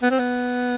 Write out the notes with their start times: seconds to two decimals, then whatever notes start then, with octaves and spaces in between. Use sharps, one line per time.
0.03 B3
0.11 C4
0.19 B3